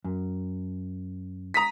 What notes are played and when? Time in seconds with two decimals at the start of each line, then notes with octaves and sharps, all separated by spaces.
0.04 F#2
1.54 A#5 D#6 B6